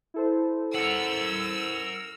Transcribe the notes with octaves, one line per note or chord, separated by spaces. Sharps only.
E4 A4 C5
A#4 F#5 E6